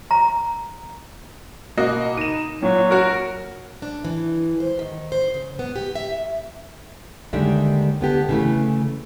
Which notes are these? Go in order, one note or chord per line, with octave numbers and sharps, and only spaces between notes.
A#5
B2 A#3 F#4 D#5
D#4 D#7 E7
A#2 F#3
F#4 A#4
D4
E3
C5
D#3
C5
C#3
B3
G4
E5
D#2 D3 D#3 G3 G#3 E5
D3 B3 G4 A4
C#3 E3 A3